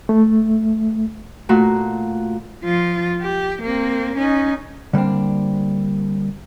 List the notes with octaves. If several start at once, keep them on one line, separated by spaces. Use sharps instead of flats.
A3
A#2 A3 A#3 F#4
F3 F4
G4
A#3 C4
C#4 D#4
D3 G3 A#3 C4 D4